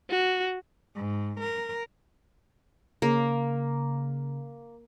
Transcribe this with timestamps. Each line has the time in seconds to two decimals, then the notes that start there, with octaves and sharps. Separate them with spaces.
0.10 F#4
0.95 G#2
1.41 A#4
3.02 C#3 A#3